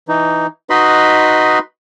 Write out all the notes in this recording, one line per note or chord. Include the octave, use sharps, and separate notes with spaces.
E3 D#4
D#4 F#4 B4 D#5 B5 C6